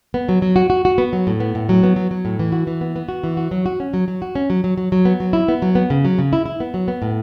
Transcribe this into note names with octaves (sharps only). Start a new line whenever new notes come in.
B3
F#3
F#3
F#4
F#4
F#4
B3
F#3
A2
B3
A2
F#3
B3
F#3
F#3
A2
E3
F#4
E3
B3
B3
F#4
E3
F#4
F#3
F#4
C#4
F#3
F#3
F#4
C#4
F#3
F#3
F#3
F#3
B3
F#3
E4
B3
F#3
B3
C#3
F#3
C#3
E4
E4
B3
F#3
B3
A2